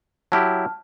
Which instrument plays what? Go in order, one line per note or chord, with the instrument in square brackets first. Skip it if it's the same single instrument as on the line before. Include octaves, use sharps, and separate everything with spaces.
[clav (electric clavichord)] F#3 E4 G4 [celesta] A5 F6